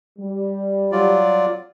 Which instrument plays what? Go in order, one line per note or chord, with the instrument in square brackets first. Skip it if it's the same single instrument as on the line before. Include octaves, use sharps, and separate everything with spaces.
[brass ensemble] G3
[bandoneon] F#3 F4 D5